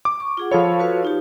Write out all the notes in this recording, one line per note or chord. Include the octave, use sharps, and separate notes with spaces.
D6
C#6
F4 G#4 F#5
F3 A4 C5 C#5 F5 B5
F#4 B4 F5
D#4 F4 G4